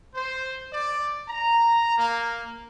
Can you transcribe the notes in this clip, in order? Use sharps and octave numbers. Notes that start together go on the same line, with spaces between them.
C5
D5
A#5
A#3